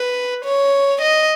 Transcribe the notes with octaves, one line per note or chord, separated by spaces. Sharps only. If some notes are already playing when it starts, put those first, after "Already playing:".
Already playing: B4
C#5
D#5